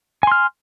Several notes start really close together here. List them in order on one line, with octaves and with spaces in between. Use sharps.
G#5 C6 F6